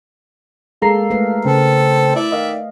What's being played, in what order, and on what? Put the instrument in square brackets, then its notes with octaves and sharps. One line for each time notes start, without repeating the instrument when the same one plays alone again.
[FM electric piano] G#3 A#5 C7 [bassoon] A#3 [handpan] A4
[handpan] A3 A#4 B4
[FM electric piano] C#3 [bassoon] C4 [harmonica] A4
[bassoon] E4 [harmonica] D5 E5
[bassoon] D#3 [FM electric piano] D#5 F5